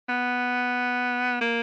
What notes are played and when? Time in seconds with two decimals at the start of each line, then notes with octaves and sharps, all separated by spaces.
0.09 B3
1.41 A#3